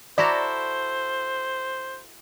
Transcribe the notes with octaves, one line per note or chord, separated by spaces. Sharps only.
E4 F#4 A4 C5 D5 A#5